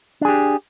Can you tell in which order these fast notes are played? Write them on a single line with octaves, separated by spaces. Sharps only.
D4 G#4 G4